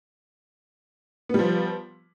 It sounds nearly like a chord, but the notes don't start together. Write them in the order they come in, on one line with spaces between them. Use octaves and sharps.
B3 G3 F3